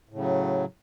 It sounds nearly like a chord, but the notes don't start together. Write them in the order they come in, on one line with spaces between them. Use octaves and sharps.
A2 C#3 F#3